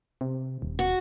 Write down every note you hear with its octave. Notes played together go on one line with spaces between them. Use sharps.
C3
D#1
F#4